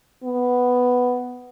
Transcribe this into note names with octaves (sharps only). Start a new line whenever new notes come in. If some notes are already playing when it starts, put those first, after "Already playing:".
B3